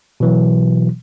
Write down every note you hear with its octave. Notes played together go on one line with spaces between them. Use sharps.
B2 E3 F#3